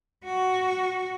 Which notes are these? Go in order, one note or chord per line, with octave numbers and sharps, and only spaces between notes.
F#4